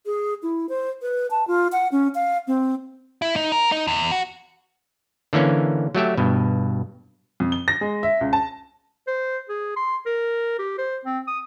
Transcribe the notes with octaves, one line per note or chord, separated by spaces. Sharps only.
G#4
E4
C5
B4
A5
F4
F#5
C#4
F5
C4
E4
D#4
A#4
D#4
E2
F#4
D3 E3 A#3 C#4
F#3 A3 G4 E5
G2 B2
F2
G7
A#6
G#3
E5
C#2
A5
C5
G#4
C6
A#4
G4
C5
C4
D#6